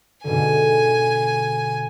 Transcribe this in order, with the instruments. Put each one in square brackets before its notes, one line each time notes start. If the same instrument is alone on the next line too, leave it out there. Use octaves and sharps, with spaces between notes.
[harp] G#2 B2 D3 [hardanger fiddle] G#5